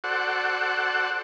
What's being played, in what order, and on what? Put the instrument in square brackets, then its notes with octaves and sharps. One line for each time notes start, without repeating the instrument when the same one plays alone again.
[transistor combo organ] F#4 A4 C5 D5 F#5